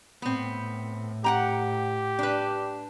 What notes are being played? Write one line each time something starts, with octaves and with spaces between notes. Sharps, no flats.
A2 B3 C4
G4 F#5 G5 A#5
D4 B4